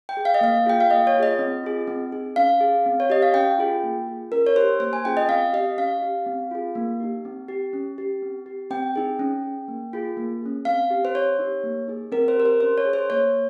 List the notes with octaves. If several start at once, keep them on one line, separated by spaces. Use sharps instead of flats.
G5
G#4
F5
D#5
A#3 F5
F4 G#4 G5
F5
A#3 D#5
C#5
F4
G#4 D#5
C4
F4 G#4
C4
D#4 G#4
C#4 F5
G#4
C4
C#5
G4 D#5
F5
C#4 G5
F4 G#4
A#3
F4 G#4
C#4 A#4
C#5
G4 C5
A#3 C5
G#5
C#4 F4 G#4 G5
D#5
C4 F5
G4 D#5
C#4 F5
G4
C4
F4 G#4
A#3
D#4 G4
C4
G4
C#4
G4
C4
G4
C4 G5
D#4 G#4
C#4
G#4
A#3
F4 G#4
A#3
C#4 G#4
C4 F5
G4
C5
C4 C#5
D#4 G4
A#3
D#4 G#4
C4 A#4
C5
G4 A#4
C5
C#4 C5
C#5
G#4
C5
A#3 C#5